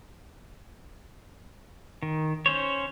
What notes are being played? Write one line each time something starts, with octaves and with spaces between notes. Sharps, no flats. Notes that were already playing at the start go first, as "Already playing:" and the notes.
D#3
C#4 C5 C#5